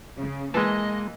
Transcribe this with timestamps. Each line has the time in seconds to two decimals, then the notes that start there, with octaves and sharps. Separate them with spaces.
0.18 C#3
0.54 E3 G#3 A#3 D#5 A5